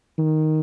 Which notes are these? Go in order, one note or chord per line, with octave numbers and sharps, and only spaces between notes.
D#3